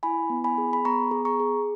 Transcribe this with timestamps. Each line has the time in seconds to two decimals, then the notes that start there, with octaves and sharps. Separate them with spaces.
0.03 E4 G#5 B5
0.30 B3
0.44 G#5 B5
0.58 G#4
0.73 B5
0.85 B3 A#5 C#6
1.11 G#4
1.25 A#5 C#6
1.40 G#4